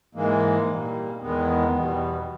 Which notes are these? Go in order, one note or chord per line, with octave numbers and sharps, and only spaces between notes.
G#2 E3 G#3 A#3
A#2 G3
E2 D#3 G#3 B3
E2 B2 G3